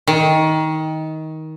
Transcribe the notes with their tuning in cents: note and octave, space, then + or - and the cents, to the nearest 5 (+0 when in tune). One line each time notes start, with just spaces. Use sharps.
D#3 +20